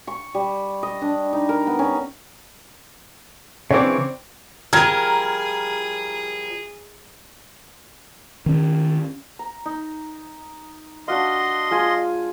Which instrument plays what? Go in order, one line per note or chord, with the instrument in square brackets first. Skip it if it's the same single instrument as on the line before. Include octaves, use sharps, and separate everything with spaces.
[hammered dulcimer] C#6
G3
D#5
D4
D#4
A#4
B3
C#4
[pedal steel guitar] C#3 E3 D6 [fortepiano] C4 D4 C#5
[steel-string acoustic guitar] F3 G3 A#4 [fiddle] G#4 [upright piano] A#5 F6 G#6
[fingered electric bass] D#3 C#4
[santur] A#5
D#4
[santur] D4 F#4 F5 [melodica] D#5 C6
[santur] G#3 F4 G#5